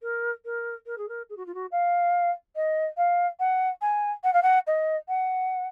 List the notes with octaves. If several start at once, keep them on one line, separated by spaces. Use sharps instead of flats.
A#4
A#4
A#4
G#4
A#4
G#4
F#4
F4
F#4
F5
D#5
F5
F#5
G#5
F#5
F5
F#5
D#5
F#5